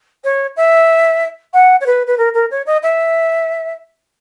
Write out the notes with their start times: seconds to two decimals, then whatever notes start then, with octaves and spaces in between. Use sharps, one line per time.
0.24 C#5
0.56 E5
1.53 F#5
1.80 C#5
1.86 B4
2.07 B4
2.17 A#4
2.34 A#4
2.51 C#5
2.66 D#5
2.83 E5